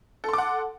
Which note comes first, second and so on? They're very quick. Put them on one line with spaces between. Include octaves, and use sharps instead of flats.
A4 C6 D6 F#5